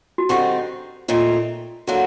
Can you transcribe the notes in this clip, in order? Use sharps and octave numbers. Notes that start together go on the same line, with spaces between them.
F#4
G2 D3 G3 C4 D#4 G4
A#2 A3 C4 D#4
D3 F#3 A#3 D4 F#4